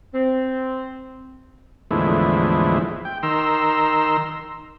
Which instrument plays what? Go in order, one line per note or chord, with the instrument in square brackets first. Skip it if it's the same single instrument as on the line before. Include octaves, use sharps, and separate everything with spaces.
[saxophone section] C4
[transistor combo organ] E2 A2 D3 F3 G#3 E4
G5
D#3 A#5 C6 E6